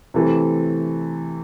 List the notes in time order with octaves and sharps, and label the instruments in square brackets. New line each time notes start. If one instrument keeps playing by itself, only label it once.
[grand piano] C3 E3 A3